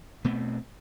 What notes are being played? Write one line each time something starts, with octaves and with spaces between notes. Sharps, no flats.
B2 A3 B3 C4